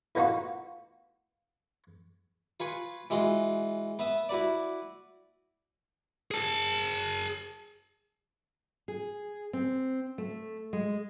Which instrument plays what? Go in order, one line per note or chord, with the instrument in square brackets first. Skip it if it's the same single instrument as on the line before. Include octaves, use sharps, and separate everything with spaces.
[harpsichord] A2 A#3 B3 D#4 F4 F#4
F4 B4 G#5 C#6
E3 G#3 F4 F#4
B3 E5 D#6
E4 F#4 B4 D5
[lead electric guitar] G#4 A5
[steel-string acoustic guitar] G#4
C4
A3
G#3